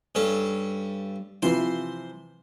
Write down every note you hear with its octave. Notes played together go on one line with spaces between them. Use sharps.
G2 C#4 A4
C3 E3 F3 C5 C6